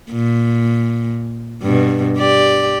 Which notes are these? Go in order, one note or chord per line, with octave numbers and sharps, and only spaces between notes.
A#2
G2 B2
G4 D5